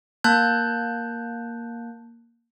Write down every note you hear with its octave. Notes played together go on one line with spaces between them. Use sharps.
A#3 A5 F#6 G6